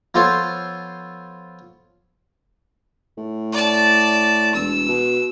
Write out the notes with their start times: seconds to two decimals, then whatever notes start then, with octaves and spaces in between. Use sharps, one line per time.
0.14 F3 B3 F4 A4 C5 C#5
3.18 A2
3.53 D5 A5
4.54 E1 E6
4.88 B2